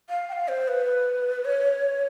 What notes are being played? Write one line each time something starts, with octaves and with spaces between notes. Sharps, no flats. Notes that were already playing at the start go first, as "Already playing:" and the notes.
F5
G5
F5
C5
B4
C#5